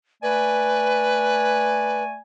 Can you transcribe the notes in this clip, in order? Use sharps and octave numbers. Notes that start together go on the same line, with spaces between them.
A3 B4 D5 G#5